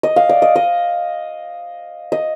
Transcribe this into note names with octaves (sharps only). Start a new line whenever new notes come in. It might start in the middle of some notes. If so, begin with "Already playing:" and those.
D#5
F5
D5
D#5
D#5
D#5